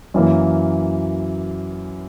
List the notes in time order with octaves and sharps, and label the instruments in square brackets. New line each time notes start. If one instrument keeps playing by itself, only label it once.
[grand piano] F#2 E3 A#3